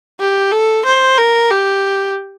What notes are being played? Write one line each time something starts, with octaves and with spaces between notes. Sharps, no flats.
G4
A4
C5
A#4
G4